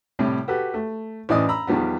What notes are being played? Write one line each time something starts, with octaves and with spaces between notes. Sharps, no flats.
A2 C3 G3
F#4 G4 A4 B4
A3
A1 F#2 E3 D5 D#5 D#6
A#5 B5 E6
E2 D#3 F3 G3 B3